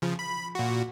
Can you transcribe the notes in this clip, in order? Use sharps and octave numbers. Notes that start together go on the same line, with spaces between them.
C#3 F3
B5
A#2 F#4